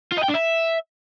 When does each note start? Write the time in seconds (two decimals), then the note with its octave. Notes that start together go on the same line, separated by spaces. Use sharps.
0.12 F4
0.18 D#5
0.24 G5
0.29 D4
0.35 E5